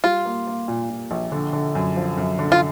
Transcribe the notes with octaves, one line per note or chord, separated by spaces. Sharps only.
G3 F4
A#3
A#3
A#2
A#2
A#1
D3
D3
F#2
F3
F#2
D3
F4